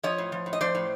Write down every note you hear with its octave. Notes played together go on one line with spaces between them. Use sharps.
F3 C#5 D#5
A2
F3
A2
D#5
F3 C5 D5
A2